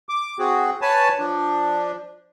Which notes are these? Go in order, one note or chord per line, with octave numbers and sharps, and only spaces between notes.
D6
C4 F#4 G#4
B4 C#5 G#5 A5
F3 D4